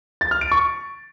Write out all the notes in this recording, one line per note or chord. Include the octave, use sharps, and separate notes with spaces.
A6
F6
D7
C#6